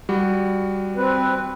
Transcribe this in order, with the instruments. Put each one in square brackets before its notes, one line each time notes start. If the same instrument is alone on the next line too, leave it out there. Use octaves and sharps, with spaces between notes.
[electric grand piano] G3 F#4
[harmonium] C4 B4